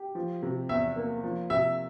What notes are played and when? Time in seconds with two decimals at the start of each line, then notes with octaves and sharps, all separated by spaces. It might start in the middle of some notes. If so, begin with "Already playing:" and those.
Already playing: G4
0.15 F3
0.42 C3
0.69 E2 E5
0.96 A#3
1.23 F3
1.50 C3 E5